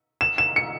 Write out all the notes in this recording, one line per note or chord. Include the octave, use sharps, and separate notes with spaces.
E7
E7
C#7